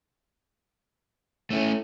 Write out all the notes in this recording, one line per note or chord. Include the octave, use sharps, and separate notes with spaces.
A2 A3 C#4